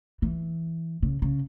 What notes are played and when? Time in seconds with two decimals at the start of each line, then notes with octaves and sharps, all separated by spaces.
0.22 E3
1.02 C#3
1.22 C#3